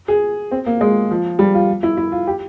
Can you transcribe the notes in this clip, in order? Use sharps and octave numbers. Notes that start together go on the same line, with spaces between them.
G#4
C4
A#3
G#3
F3
G3
F4
E4
E4
F4
G4